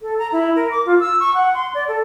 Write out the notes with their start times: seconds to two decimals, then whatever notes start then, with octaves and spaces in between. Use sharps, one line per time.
0.01 A4
0.18 A#5
0.32 E4
0.56 A#4
0.71 D6
0.86 F4
1.00 E6
1.20 C#6
1.34 F#5
1.54 C6
1.74 D5
1.88 A4